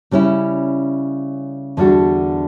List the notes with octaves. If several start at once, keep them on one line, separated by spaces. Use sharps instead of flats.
C#3 G3 C#4 E4
E2 D3 G3 D4 F#4